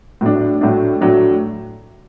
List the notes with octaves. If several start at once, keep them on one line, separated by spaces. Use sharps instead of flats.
A2 F#3 A3 D4
A2 F#3 A3 D4
A2 F#3 A3 D4